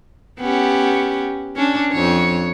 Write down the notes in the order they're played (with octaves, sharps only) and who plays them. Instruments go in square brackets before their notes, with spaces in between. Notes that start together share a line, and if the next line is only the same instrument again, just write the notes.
[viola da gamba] B3 C#4 G4
C#4 D4
F2 C#5